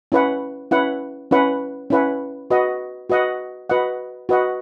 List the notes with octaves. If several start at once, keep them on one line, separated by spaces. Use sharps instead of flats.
C#4 E4 B4 F#5
C#4 E4 B4 F#5
C#4 E4 B4 F#5
C#4 E4 B4 F#5
F#4 B4 D#5 F#5
F#4 B4 D#5 F#5
F#4 B4 D#5 F#5
F#4 B4 D#5 F#5